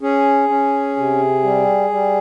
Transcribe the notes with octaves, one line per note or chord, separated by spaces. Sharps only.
C#4 G#4
C#4
C3
G3
G3